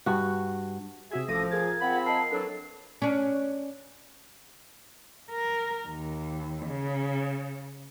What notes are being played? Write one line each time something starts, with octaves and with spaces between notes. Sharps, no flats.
G2 F#4
C3 F#4 G#4 E5 G#6
A1 F3 A4 D6 A#6 D#7
F4 G#4 A#4 G#6 A6
F3 C4 F#5 B5
A#4 D#5 A5 C7
E3 F#3 D4 A4
C#4 D4
A#4
D#2
C#3